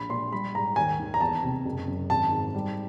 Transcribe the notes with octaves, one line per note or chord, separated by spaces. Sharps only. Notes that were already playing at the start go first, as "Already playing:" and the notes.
Already playing: A#1 B5
A#2 C6
G3 B5
G#2 A#5
D#2 G#5
D#3
A#5
E2 A5
C3
F#1
F#2
G#1 A5
G#2
G3